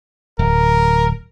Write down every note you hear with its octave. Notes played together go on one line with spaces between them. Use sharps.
D1 A#4